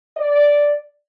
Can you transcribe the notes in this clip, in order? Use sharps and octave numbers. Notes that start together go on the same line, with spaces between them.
D5